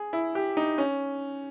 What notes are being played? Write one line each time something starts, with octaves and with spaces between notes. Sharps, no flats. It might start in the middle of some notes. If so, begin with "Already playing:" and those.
Already playing: G#4
E4
G4
D#4
C#4